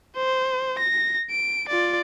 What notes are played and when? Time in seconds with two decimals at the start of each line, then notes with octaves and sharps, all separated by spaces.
0.16 C5
0.79 A#6
1.30 D7
1.69 F4 D5